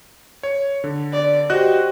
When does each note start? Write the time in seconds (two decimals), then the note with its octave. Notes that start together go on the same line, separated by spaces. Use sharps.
0.43 C#5
0.84 D3
1.12 D5
1.50 F#4 G4 C5 D#5 F#6